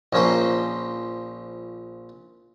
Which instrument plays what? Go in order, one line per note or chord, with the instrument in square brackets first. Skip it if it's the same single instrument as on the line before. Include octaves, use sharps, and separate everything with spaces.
[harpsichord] A#1 F3 C#4 A#4 C5